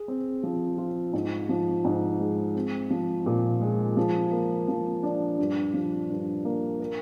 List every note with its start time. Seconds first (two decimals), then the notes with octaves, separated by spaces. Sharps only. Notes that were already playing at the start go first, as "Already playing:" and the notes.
Already playing: G#4
0.08 C4
0.43 F3
0.78 F4
1.13 G#2
1.49 F3
1.85 G#2
2.20 G#3
2.55 C4
2.90 F3
3.26 A#2
3.61 G#3
3.97 F3
4.32 A#3
4.68 F3
5.03 D4
5.39 G2
5.74 F3
6.10 G2
6.45 A#3
6.80 A#4